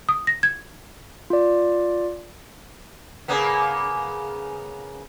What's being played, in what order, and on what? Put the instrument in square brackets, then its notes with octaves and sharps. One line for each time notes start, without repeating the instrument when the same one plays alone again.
[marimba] D#6
A#6
G#6
[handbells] F4 D5
[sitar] C#3 A#3 B3